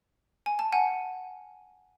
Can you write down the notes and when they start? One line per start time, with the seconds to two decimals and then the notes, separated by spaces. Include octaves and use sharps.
0.46 G#5
0.59 A5
0.72 F#5 G#5